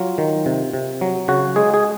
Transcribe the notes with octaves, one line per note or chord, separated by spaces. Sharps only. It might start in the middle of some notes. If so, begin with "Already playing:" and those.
Already playing: F#3 F4
D#3
C3
C3
F#3
C#3 F#4
G#3 G#4
G#4